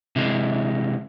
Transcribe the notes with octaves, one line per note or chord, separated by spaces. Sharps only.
C3 E3 G#3